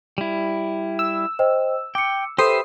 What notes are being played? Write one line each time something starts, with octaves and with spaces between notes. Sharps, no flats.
G3 E4
E6
C5 D#5 G5
G5 D6 C#7
G4 A4 B4 C5 E5 D#6 C7